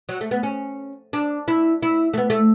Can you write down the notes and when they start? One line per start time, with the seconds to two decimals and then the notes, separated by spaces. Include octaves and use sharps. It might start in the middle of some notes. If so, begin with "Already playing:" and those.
0.09 F#3
0.21 A3
0.31 B3
0.43 C#4
1.13 D4
1.48 E4
1.82 E4
2.13 A3
2.18 B3
2.30 A3